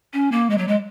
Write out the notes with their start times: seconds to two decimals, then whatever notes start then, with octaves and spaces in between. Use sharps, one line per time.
0.13 C#4
0.32 A#3
0.50 G#3
0.58 F#3
0.68 G#3